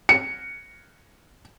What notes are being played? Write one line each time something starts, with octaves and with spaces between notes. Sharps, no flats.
C#7